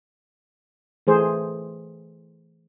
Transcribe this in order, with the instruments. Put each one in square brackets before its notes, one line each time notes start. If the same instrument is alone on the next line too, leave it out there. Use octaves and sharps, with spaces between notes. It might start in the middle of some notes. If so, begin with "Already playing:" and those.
[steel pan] E3 A3 G#4 C5